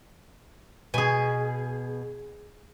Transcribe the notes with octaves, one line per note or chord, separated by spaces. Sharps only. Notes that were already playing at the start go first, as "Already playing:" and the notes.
B2 G#4 G#5